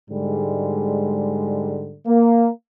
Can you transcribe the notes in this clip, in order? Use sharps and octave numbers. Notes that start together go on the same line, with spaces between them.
G#2 D3 G3 G#3
A#3